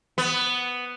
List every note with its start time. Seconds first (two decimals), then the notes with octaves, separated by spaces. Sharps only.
0.18 B3